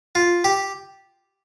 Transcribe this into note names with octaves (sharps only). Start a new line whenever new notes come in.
F4
G4